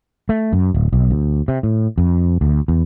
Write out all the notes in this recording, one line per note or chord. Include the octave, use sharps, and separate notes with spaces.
A3
F#2
D1
B1
D2
C3
A2
F2
D2
E2